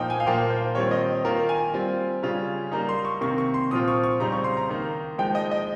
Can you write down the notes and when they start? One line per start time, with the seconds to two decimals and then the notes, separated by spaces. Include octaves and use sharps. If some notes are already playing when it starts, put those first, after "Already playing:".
Already playing: A#2 F3 A#3 D#4 D#5 G5
0.10 G#5
0.20 F5
0.26 A#2 F3 A#3 F4 G5
0.50 C5
0.75 D#3 G3 C4 F4 C#5
0.91 D#5
1.24 D#3 A#3 F4 A#4
1.49 G#5
1.73 G3 C4 F4
2.23 C#3 G3 C#4 F4
2.72 G3 A#3 D#4 A#5
2.89 C6
3.05 C#6
3.21 C3 D#3 A#3 C#6
3.38 C#6
3.54 C6
3.71 A#2 F3 C4 F4 D#6
3.88 C#6
4.04 C#6
4.20 C#3 G3 C4 D#4 A#5
4.32 C#6
4.44 C6
4.57 A#5
4.69 D#3 A#3 D#4
5.18 F3 G#3 D#4 G5
5.35 D#5
5.51 D#5